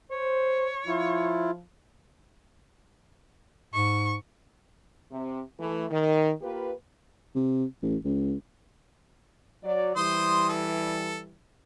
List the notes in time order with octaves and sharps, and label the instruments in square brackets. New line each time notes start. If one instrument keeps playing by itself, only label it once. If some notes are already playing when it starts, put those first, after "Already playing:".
[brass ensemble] C5 [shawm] C#5
[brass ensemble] F3 [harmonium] E4 F4
[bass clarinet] G#2 [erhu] C#6
[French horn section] C3
E3 A3
D#3
A#3 F4 G4 B4
[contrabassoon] C3
A1
C#2
[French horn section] F#3 D5
[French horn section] E3 G3 [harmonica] C5 C6 D#6
[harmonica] A4